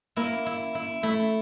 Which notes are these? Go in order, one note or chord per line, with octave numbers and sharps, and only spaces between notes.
A#3 E4
E4
E4
A3 E4